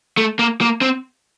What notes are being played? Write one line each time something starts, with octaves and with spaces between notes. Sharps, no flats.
A3
A#3
A#3
C4